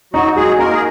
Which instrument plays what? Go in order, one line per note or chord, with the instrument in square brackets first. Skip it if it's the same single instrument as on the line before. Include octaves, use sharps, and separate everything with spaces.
[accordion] F#3 F#4 [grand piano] D#4
[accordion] G#3 G#4 [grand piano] F#4
[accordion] A#3 A#4 [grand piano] D#4
[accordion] G#4